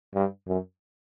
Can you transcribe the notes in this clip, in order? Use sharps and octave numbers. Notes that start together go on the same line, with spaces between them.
G2
F#2